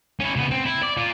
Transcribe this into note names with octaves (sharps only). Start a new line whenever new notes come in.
C#4 E4
C#3 B3
C4
E4
D5
F4 D5